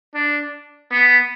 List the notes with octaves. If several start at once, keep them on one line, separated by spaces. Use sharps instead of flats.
D4
B3